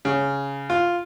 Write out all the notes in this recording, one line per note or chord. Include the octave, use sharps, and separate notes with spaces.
C#3
F4